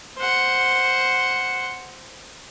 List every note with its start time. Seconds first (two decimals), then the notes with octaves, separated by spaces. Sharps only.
0.17 C5 F#5